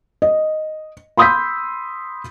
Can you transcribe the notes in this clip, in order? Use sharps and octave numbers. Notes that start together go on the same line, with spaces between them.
D#5
B5 C6 D#6 E6 G6 B6